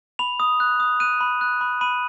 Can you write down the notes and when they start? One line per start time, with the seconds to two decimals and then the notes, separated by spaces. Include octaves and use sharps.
0.19 B5 F7
0.40 D#6
0.60 F#6
0.80 D#6
1.00 F#6 D#7
1.21 B5
1.41 F#6
1.61 B5
1.81 B5 D#7